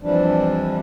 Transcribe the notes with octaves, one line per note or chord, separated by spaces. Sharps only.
F2 E3 F3 G3 D4